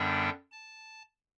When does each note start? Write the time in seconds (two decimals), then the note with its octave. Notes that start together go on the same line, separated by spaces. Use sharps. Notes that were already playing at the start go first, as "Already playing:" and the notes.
Already playing: F#2 D3 G3 B3 D4 G5
0.52 A5